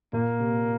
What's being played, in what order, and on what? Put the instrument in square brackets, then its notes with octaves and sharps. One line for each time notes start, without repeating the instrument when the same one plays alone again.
[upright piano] A#2 [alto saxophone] A#3
[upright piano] C3